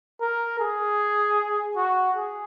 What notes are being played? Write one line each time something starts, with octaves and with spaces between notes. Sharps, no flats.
A#4
G#4
F#4
G#4